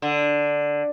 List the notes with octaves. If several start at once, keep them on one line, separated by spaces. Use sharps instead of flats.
D3